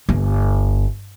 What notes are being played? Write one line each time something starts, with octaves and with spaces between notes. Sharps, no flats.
G1